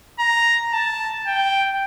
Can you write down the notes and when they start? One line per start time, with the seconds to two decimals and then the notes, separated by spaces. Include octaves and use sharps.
0.20 A#5
0.73 A5
1.27 G5